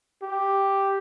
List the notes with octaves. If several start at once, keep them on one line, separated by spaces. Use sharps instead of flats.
G4